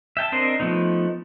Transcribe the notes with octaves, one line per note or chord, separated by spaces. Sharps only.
E5 G5 A5
C4 D4 A#4 C5 D#5
F3 A3 B3 D#4